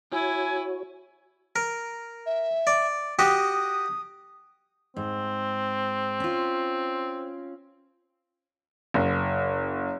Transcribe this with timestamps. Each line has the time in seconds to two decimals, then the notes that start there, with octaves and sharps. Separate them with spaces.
0.12 E4 F#4 C#5 G#5
1.56 A#4
2.26 E5
2.67 D5
3.19 F#4 G4 D#5 D#6
4.96 G#2 C4
6.20 C#4 F4
8.94 F#1